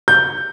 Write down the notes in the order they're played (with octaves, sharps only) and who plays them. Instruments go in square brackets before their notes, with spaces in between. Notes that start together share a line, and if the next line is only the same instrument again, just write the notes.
[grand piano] G6